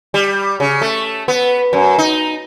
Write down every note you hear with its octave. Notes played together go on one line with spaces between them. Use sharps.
G3
C#3
A3
B3
F#2
D#4